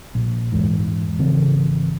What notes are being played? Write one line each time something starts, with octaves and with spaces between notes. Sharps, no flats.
A#1
E2 G#2
G#1 C#3 E3 C4